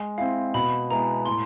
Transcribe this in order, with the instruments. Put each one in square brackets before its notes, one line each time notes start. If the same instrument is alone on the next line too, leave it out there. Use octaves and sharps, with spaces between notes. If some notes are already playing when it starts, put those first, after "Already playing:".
Already playing: [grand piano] G#3
[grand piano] C4 E4 [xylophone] F5
[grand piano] B2 [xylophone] B5
[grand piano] G#3 B3 E4 [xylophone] A#5
[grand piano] A2 [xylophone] C6